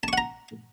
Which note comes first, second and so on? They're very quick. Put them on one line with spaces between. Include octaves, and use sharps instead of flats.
A5 C#6 F#5 A#5